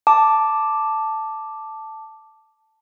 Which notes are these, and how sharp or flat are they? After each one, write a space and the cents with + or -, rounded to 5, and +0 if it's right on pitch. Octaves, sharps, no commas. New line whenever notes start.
A5 +0 D6 +0